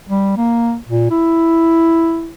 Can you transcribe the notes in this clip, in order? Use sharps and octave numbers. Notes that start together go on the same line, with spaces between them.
G3
A#3
A#2
E4